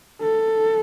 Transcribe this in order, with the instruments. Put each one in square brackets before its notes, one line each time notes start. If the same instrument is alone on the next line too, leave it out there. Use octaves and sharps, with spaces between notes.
[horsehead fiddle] A4